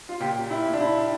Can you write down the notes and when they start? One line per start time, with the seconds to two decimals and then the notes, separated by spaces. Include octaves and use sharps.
0.09 F4
0.20 A#2 G4
0.50 E4
0.66 A#2
0.73 D4
0.80 E4